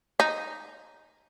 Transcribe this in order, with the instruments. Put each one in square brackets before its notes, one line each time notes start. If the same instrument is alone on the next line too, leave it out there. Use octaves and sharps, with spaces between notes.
[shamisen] D#4